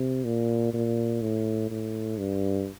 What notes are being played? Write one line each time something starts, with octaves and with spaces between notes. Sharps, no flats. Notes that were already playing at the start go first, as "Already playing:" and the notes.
Already playing: C3
A#2
A#2
A2
A2
G2